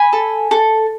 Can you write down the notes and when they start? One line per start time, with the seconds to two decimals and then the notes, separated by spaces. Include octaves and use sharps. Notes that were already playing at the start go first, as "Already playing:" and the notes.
Already playing: G#5 B5
0.13 A4
0.51 A4